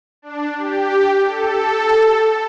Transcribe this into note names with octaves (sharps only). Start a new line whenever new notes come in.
D4
G4
A4